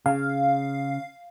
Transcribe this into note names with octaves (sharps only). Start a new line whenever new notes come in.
C#3 F5